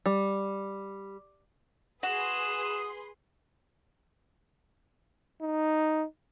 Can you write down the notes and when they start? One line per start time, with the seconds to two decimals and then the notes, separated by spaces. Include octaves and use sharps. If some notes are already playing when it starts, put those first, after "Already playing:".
0.06 G3
2.03 F#4 G#4 B4 C6 D#6 F#6 E7
5.41 D#4